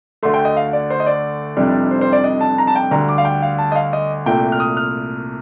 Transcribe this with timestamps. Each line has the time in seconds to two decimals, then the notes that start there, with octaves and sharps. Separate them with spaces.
0.23 D2 D3 A3 C6
0.34 G5
0.45 D#5
0.56 F5
0.73 D5
0.90 C5
1.00 D#5
1.06 D5
1.57 F1 F2 C3 G3 D4
1.91 C5
2.01 C5
2.13 D5
2.24 D#5
2.41 A5
2.58 A#5
2.67 A5
2.75 G5
2.91 D2 D3 G3 A#5
3.09 D6
3.18 F5
3.25 G5
3.42 F5
3.58 A5
3.72 D#5
3.75 F5
3.93 D#5
4.26 C2 A#2 A3 G5
4.52 F6
4.60 D#6
4.77 F6